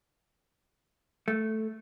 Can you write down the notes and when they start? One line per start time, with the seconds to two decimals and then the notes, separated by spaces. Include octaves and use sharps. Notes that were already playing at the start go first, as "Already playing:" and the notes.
1.28 A3